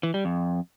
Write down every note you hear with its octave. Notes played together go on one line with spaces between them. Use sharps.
E3
G3
F2